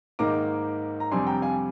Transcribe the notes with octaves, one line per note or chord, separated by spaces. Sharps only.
G#2 D#3 A#3 D#4 A#5 D6
A#5
F2 C3 G3 D4 G#5 C6
G5 A#5
F5 G#5